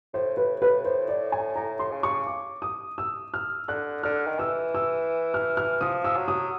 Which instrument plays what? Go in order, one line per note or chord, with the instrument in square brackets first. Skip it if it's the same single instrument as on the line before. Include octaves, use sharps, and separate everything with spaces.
[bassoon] A2 [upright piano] C5
[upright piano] B4
B4
C5
D5
G#5
[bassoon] A2 [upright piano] A#5
[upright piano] C6
[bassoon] C#3
[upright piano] C#6
D6
D#6
E6
F6
[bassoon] D3 [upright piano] F#6
[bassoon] D3 [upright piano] F6
[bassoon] D#3
[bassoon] E3 [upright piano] E6
[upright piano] E6
F6
F6
[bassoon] F3 [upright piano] D#6
[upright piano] E6
[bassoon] F#3
[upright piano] D#6